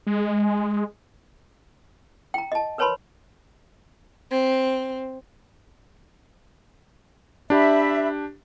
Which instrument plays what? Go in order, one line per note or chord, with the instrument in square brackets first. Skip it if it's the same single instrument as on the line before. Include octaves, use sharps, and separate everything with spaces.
[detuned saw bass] G#3
[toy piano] G5 A#5
D#5 A5
A#4 B4 C#5 A5 B5 C6
[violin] C4
[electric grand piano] D4 G4 [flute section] E5 B5